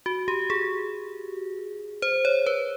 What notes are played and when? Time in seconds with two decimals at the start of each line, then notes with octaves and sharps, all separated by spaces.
0.06 F#4
0.28 G4
0.50 G#4
2.02 C5
2.25 C#5
2.47 B4